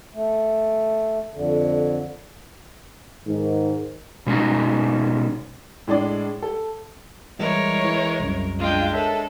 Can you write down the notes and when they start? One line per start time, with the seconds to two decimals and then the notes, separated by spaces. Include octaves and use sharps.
0.15 A3
1.34 F2 D3
3.27 G#2 D#3
4.27 B2 G#3 C#4 D#4
5.87 A2 G#3 D4 D5
6.42 A4
7.39 E3 G3 G#3 E4 A#4 C#5
7.84 E3
8.20 C2 F#2
8.59 G#3 D4 F4 G5
8.94 A4 A#4 C#5 E5